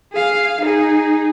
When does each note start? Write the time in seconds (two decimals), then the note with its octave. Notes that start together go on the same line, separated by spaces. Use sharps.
0.12 G#4 F5
0.60 D#4 G#4